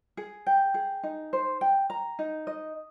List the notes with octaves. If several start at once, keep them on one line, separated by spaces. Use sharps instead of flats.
G#4
G5
G#4
D#4
C5
G5
A#5
D#4
D#5